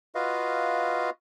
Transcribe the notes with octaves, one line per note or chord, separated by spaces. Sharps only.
F4 F#4 B4 D#5 F5